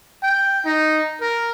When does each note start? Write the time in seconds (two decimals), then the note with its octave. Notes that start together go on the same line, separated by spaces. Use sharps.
0.23 G5
0.65 D#4
1.21 A#4